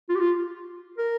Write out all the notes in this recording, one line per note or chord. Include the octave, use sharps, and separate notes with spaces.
F4
G4
F4
A#4